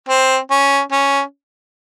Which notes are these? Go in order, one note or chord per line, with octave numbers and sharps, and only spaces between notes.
C4
C#4
C#4